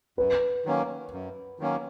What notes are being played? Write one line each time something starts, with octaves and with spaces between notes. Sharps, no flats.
F#2 B4
D#3 F#3 A#3 C#4
F#2
D#3 F#3 A#3 C#4